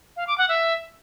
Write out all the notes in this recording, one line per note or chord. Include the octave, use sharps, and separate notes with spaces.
F5
D6
F#5
E5